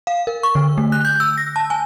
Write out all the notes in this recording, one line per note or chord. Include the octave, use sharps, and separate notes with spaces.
F5
A#4
C#6
D3
A3
F#6
G6
E6
A#6
A5
G#5